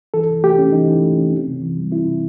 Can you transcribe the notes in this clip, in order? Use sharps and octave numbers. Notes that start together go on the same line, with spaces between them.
E3 A4
E3
A3 G4
C#4
E3 D#4
E3
A3
C#4
C4
C3
E3
G3
C4 E4
C3